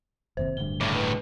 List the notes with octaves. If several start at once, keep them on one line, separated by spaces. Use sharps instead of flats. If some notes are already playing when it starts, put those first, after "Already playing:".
F#1 D#2 C3 C5
D1 D2 G2 G7
A2 C#3 D6
B4